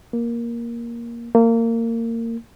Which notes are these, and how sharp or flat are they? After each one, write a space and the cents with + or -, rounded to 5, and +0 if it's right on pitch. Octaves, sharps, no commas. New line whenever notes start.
A#3 +10
A#3 -25